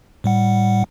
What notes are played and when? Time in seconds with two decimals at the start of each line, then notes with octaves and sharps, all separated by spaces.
0.24 A2 G3 F#5